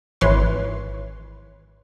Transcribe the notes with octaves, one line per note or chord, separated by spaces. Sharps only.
G#1 E3 B4 C#5 C6